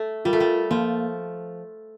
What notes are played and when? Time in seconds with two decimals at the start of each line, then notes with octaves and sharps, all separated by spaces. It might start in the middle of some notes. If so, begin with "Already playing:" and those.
Already playing: A3
0.25 G3 F4 A#4
0.33 A3
0.40 G3
0.71 F3 A#3